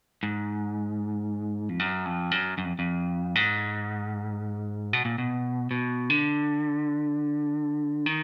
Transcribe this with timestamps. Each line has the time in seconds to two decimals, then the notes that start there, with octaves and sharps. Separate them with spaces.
0.23 G#2
1.69 F2
1.79 F#2
2.05 F2
2.31 F#2
2.58 F#2
2.65 F2
2.79 F2
3.35 G#2
4.93 B2
5.05 A#2
5.18 B2
5.71 B2
6.10 D3
8.06 D#3